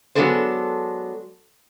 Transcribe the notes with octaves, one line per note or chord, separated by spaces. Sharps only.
F#3 G#3 B3 D4 A4 C5